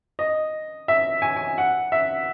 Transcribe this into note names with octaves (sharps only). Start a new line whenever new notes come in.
D#5
E5
G#5
G#5
F#5
E5